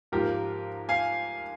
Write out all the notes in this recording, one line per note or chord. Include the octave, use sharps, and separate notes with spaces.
G#2 F3 A#3 G4 A#4
F5 G#5